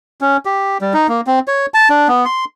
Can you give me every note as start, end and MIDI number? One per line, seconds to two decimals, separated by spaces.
0.21 0.37 61
0.45 0.78 67
0.81 0.93 55
0.94 1.07 63
1.08 1.21 58
1.27 1.39 60
1.48 1.66 73
1.74 1.89 81
1.90 2.08 62
2.08 2.25 59
2.25 2.45 84